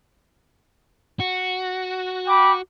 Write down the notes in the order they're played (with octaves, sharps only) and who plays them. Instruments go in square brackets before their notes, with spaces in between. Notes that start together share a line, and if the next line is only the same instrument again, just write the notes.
[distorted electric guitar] F#4
[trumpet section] G5 B5 D6